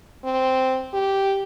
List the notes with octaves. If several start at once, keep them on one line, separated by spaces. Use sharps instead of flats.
C4
G4